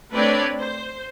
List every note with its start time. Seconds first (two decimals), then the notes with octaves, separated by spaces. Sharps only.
0.13 A3 C4 D4 B4 C#5 D5
0.59 C5